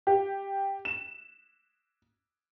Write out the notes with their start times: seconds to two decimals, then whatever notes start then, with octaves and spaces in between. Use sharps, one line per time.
0.07 G4
0.85 E7